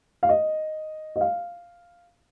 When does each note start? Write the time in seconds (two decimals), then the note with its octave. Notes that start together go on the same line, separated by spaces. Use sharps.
0.23 F5
0.29 D#5
1.16 D#5
1.21 F5